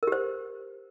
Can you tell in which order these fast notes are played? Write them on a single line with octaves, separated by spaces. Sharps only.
A#4 G4 C5